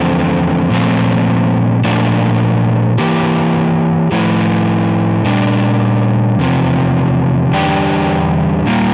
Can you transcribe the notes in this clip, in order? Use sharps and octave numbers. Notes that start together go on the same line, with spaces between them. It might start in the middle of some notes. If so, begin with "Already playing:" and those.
Already playing: E2 D3 F3 A3 C4
A#2 F3 A3 C4
A#2 F3 A3 D4 F4
E3 A#3 E4 G4
A2 F3 A3 E4
A#2 G3 D4
E2 C3 F3
E2 D3 G3 D4 G4
A#2 G3 A#3 F4